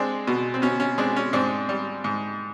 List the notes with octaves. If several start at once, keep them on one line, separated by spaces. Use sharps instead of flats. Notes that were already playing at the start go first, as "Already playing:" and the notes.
Already playing: G#3 C4 D4
B2
C4
B2 C#4
C#4
G#3 C4 D4
C#4
G#2 C4 D4
G3
G#2